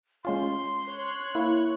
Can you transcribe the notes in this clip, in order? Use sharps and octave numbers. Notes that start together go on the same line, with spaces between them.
G#3 C#4 F4 C6
C#5 F#6
A#3 E4